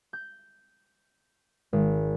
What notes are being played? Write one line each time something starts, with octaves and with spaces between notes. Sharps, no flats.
G6
G#1